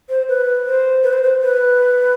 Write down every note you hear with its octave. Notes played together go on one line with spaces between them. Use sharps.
C5
B4
C5
B4
C5
C5
B4